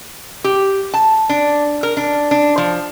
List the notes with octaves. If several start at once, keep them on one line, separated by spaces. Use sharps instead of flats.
G4
A5
D4
A#4
D4
D4
F3